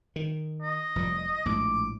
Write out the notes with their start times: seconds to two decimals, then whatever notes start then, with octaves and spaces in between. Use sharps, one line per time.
0.16 D#3
0.62 D#5
0.96 F1 F3 G3
1.45 A#1 A2 G#3 D6